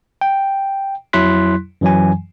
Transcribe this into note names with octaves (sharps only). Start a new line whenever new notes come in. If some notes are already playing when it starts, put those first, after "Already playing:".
G5
F2 F#3 E4 C6 F#6 B6
F#2 E3 F#3 G#5